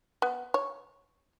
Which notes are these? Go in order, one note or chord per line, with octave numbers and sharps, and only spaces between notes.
B3
C#5